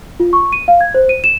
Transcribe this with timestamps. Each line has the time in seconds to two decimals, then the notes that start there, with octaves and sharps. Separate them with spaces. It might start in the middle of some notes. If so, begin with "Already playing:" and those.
0.20 F4
0.33 C#6
0.53 D#7
0.68 F5
0.81 G#6
0.94 C5
1.09 D#7
1.24 E7